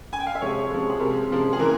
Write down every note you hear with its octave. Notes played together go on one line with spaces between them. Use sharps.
G#5
G5
F5
E5
C3 F3 G#3 C#5
C3 F3 G#3
G#4
C3 F3 G#3 A#4
C3 F3 G#3
G#4
E3 A#3 A#4